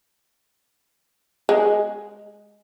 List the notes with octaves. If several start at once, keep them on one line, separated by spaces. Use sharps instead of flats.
G#3